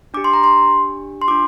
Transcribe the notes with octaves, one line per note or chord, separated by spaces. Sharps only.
D4 G4 D6
C6
A#5
C6
C6
D4 F4 D6